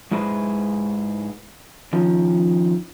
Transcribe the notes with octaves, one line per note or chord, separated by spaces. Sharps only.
G#2 G#3 E4 G#4 B4 C5
D#3 F3 C#4